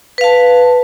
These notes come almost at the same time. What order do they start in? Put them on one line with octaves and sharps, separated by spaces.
B4 F5 A5